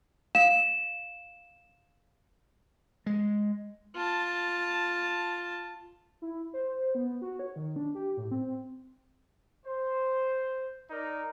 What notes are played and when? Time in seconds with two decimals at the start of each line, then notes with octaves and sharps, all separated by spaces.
0.35 F5 E7
3.06 G#3
3.95 F4 A5
6.22 E4
6.54 C5
6.95 B3
7.22 F#4
7.39 C#5
7.56 D#3
7.76 D4
7.95 G4
8.17 A2
8.31 C4
9.65 C5
10.90 D#4 A#4 D5